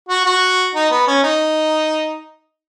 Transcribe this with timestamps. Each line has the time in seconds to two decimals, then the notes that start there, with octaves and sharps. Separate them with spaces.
0.09 F#4
0.25 F#4
0.75 D#4
0.90 B3
1.07 C#4
1.23 D#4